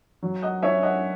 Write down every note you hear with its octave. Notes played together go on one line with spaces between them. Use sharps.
F#3
D#5 F#5
C#4 C#5 E5
D#5 F#5